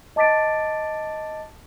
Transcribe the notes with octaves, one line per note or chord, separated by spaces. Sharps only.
D#5 A5 D6 A6 B6 D7